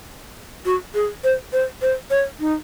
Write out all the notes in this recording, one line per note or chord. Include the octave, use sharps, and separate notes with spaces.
F#4
G#4
C5
C5
C5
C#5
D#4